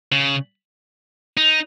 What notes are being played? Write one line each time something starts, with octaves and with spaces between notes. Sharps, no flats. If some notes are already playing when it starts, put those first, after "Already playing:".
C#3
D#4